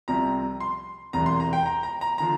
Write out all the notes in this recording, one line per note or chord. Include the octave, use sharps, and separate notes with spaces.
C2 C3 F3 A#5
C6
E1 E2 C3 E3 A#5
C6
A#5
G5
A#5
A#5
A#5
D3 F3 A#5